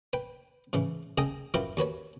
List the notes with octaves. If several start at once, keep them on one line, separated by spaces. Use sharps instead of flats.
B4 G5
G#2 C#3 E3
C#3 G#4 A4 D#5 G5 G#5
F#2 F#3 E4 F4 B4 G5
D#2 F#4 B4 C#5